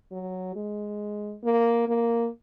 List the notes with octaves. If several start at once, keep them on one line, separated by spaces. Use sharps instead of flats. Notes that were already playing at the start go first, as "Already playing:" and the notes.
F#3
G#3
A#3
A#3